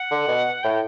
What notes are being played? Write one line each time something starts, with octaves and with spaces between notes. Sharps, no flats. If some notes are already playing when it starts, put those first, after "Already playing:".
Already playing: F#5
D3
B2
A2 G5